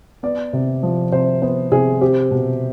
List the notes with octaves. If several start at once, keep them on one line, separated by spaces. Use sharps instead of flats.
B3 D5
C3
F3
C3 C5
B3 C5
C3 G#4
C4 G4
B2